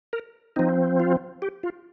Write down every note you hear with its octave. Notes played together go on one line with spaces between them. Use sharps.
A#4
F3 C4 D#4
F4
G4
F4